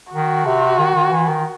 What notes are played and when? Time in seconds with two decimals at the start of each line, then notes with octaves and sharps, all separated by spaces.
0.12 D#3 F#4
0.46 C3
0.79 D#3
0.95 D#3
1.11 E3
1.28 D#3